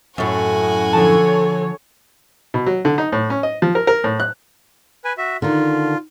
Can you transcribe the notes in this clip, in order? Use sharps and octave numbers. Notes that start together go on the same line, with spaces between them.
F#2 A2 F#4 G#5
D3 F3 A4 C#5 A5
B2
F#3
D3
D#4
A2
C#4
D#5
F3
A#4
A#4
A2
F#6
B4 G#5
F#4 E5
D3 D#3 F4